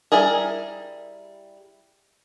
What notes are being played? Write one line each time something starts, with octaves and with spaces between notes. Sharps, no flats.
G3 E4 G#4 A#4